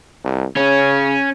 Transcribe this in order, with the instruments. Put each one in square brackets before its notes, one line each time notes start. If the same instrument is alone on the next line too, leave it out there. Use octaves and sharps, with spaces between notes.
[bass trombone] C2
[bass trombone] C#3 [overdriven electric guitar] C#4